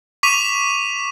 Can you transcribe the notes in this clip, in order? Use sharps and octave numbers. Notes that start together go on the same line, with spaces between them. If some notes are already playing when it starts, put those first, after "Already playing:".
C#6 D6 B6 D#7 F7